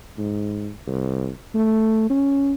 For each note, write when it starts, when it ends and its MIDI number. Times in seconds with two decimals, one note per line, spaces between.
0.18 0.69 44
0.87 1.29 36
1.55 2.09 57
2.10 2.54 61